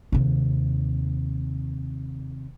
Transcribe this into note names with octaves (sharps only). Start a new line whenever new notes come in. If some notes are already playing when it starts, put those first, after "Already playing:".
D#2 C3